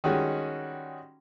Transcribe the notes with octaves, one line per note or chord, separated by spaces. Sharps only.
D#3 G3 G#3 C#4 F#4